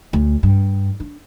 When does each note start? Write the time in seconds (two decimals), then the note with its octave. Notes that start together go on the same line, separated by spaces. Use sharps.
0.13 D2
0.43 G2
1.00 D4